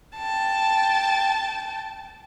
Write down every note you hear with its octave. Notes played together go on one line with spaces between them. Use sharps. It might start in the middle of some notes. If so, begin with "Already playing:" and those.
G5 A5